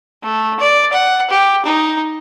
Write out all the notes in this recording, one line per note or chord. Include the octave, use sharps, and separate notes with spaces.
A3
D5
F#5
G4
D#4